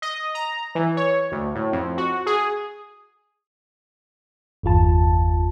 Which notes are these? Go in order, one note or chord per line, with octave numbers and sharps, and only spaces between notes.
D#5
A#5
E3
C#5
D2
A2
F2
F#4
G#4
G1 E2 F4 A5